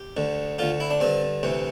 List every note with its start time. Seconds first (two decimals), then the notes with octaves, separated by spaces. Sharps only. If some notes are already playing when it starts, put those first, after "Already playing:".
Already playing: G4
0.17 D2 D3
0.59 D2 D3 F4
0.80 E4
0.90 D4
1.00 G2 D3 C4
1.43 D2 C3 E3